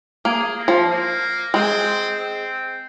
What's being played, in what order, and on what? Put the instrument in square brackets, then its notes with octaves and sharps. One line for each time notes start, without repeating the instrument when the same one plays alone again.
[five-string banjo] A#3 [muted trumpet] G#4
[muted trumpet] A#3
[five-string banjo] F3
[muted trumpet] A#3
[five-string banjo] G#3 [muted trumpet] C4
[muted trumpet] C4